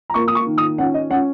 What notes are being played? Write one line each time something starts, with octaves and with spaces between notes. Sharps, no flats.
A#5
A#3 C#6
D#6
C#6
D#3
D#6
C#4 F#5
D#5
C#4 F#5